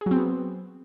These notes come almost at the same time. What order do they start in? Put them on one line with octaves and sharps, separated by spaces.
G#4 F#3 C4 B3